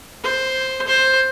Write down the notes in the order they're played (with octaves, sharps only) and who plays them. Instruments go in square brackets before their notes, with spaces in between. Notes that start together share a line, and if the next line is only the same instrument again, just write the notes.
[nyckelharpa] C5
C5